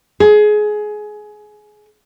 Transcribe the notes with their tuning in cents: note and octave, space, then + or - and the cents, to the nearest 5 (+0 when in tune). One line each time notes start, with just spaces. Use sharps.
G#4 +20